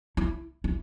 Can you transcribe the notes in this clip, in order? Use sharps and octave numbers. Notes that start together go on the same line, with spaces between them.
E4
E4